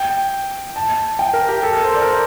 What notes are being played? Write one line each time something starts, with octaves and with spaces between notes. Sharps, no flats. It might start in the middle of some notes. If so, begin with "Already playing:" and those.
Already playing: G5
A5
G5
A#4
G4
A4
A#4
C5
D5
A#4
C5